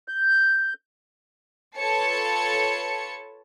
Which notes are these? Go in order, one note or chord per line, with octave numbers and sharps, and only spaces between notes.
G6
F4 A4 B4 C#5 A5 C#7